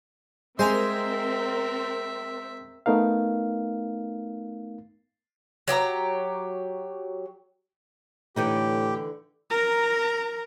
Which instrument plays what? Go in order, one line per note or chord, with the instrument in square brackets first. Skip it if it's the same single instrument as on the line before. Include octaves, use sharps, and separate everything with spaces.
[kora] G#3 [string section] C4 A#4 [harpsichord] C5 G#5 A#5 [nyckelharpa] E5
[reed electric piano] A3 B3 D#4 A#4 F5
[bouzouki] F#3 G4 E5 A#5
[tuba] A2 [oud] D3 E3 D#4 [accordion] G4
[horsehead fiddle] A#4 A#5